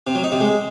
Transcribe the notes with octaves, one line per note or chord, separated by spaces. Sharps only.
C3
F#3
D#4
C3
G#3